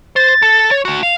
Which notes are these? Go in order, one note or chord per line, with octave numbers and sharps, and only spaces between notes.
C5 A6
A4
C#5
D2 F#4
F5 F7